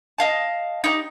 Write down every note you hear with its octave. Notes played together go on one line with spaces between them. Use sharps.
D#5 F5 A5
D#4 E4 G4